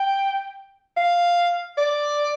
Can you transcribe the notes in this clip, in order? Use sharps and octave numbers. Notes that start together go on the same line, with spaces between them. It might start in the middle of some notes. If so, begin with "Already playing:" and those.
Already playing: G5
F5
D5